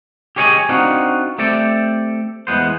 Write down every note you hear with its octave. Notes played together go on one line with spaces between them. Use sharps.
G4 G#4 C#5 D#5 G5 G#5
C4 D4 D#4 F4 F#4
A3 C4 G4 A4 D5
E2 G#3 B3 C5